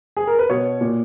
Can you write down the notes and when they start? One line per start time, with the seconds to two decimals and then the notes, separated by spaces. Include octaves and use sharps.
0.17 G#4
0.27 A#4
0.39 B4
0.50 B2 C#5
0.81 A#2